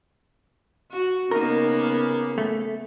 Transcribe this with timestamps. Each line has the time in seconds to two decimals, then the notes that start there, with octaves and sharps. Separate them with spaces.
0.91 F#4
1.31 C#3 A#3 B3 D#4 A#4
2.38 A3